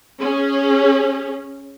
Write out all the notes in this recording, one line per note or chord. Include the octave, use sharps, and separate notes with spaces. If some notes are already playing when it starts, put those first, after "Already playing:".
C#4 G#4